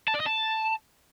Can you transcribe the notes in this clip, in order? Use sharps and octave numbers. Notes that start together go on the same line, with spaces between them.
A5
D5
D#5
A5